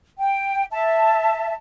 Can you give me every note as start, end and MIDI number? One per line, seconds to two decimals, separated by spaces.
0.18 0.65 79
0.71 1.54 76
0.71 1.54 81